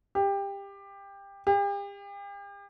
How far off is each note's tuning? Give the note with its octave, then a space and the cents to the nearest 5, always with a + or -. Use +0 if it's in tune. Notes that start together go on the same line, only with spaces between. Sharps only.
G4 +20
G4 +40